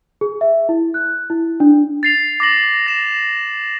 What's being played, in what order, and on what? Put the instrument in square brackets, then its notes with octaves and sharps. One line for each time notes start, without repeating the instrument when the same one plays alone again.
[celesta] G#4
E5
E4
F#6
E4
D4
[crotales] A6 C7 F7
D6 A#6 F#7
A#6 E7